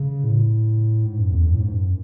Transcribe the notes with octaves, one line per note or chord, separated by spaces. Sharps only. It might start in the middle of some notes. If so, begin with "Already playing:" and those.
Already playing: C#3
A2
G#2
F#2
E2
F#2
A2
G#2
F#2